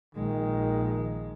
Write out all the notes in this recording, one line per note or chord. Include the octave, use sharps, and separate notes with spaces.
A#1 D#3 G#3